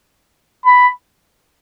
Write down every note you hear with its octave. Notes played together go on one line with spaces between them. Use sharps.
B5